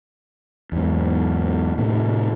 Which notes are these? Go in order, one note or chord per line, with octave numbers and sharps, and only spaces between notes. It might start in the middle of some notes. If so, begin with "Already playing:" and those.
E2 G#2
A2 C3 D#3